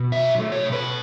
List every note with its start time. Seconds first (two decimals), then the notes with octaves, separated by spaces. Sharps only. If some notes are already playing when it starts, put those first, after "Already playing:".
Already playing: B2
0.12 F#3 E5
0.39 A3
0.52 C#5
0.65 B2
0.72 B4